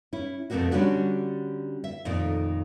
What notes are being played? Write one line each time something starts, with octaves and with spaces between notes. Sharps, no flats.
C#4 E4
F2 B2 A3 A#3 C4 F#4
D3 G3 C#4 D4 F#4
E5
F2 A#2 D#3 A3